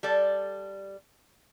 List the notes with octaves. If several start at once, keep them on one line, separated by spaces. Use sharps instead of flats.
G3 A4 D5